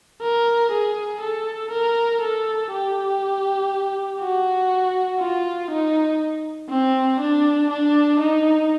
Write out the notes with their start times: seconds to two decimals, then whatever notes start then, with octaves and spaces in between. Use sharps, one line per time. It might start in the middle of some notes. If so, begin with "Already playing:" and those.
0.21 A#4
0.72 G#4
1.21 A4
1.71 A#4
2.21 A4
2.71 G4
4.21 F#4
5.20 F4
5.71 D#4
6.70 C4
7.20 D4
7.70 D4
8.20 D#4